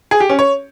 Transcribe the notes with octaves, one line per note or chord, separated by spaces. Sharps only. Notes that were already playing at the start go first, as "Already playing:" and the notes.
G#4
G4
C#4
C#5